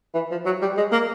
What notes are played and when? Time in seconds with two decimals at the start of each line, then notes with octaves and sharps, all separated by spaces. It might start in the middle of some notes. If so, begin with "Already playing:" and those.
0.14 E3
0.31 F3
0.45 F#3
0.62 G3
0.77 G#3
0.92 A#3